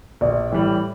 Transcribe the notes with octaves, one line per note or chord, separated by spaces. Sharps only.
A#1 D5
A2 E3 G3